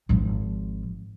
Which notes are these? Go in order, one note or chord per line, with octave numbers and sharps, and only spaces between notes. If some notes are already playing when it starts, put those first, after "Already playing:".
G#1 F3